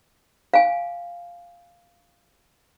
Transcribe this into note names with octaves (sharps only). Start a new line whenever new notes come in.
F5 G#5